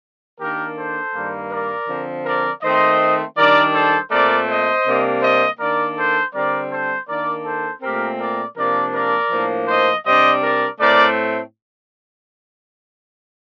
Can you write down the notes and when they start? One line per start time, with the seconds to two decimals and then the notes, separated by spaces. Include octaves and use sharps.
0.39 D#3 A#3 D4 G4 A#4
0.76 A4 C5
1.13 G2 D#3 G3 A#3
1.50 A#4 D5
1.87 D3 F3 C4
2.24 A#4 D5
2.62 D#3 A3 C4 C5 D#5
3.36 D#3 G3 D4 A#4 D5
3.73 A4 C5
4.10 A#2 A3 C4 A#4 D5
4.47 C5 D#5
4.85 C3 G3 A#3 D4
5.22 C5 D#5
5.60 D#3 A#3 D4 A#4 D5
5.97 A4 C5
6.33 D3 G3 C4 A#4 D5
6.70 A4 C5
7.08 D#3 A#3 D4 A#4 D5
7.45 A4 C5
7.82 A#2 A3 C4 G4 A#4
8.19 A#4 D5
8.56 C3 F3 A#3 D4 A#4 D5
8.94 A#4 D5
9.30 A2 F3 A#3 D4
9.67 C5 D#5
10.05 C3 G3 D4 C5 D#5
10.42 A#4 D5
10.80 A2 A3 C4 A#4 D5